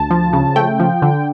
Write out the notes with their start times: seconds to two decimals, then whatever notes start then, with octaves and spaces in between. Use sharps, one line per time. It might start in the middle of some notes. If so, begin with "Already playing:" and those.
Already playing: D2 A5
0.11 F3
0.33 C#3
0.56 A3 G5
0.80 F3
1.02 D3